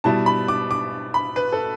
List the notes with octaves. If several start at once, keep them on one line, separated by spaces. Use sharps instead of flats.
B2 G3 E4 A5
B5
D6
D6
B5
B4
A4